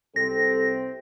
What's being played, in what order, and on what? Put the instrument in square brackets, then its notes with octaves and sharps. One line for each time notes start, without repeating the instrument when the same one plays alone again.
[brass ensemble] C2 C3 C4 [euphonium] A4 [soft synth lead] A#6